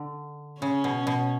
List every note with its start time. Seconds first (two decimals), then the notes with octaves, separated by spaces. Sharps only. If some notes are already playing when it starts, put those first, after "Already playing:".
Already playing: D3
0.61 C#3 C#4
0.84 B2
1.07 B2